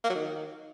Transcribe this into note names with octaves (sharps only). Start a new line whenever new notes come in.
A#3
F#3
D#3